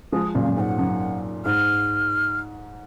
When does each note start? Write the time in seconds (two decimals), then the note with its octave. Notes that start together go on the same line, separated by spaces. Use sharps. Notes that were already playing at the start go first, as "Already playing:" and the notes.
0.12 F3 G#3 D#6
0.34 F#2 A#2 F5
0.46 F#2
0.57 G#2 G#5
0.60 F#5
0.79 F#2
1.46 G#2 F6